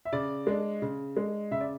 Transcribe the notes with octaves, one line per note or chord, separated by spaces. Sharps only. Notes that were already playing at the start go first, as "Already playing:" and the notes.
E5
C#3 D5
G#3 D4
C#3
G#3 D4
C#3 E5
D5